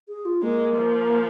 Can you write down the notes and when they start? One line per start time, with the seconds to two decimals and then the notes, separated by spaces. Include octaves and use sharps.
0.08 G#4
0.25 F4
0.42 G#3 A#3
0.76 F3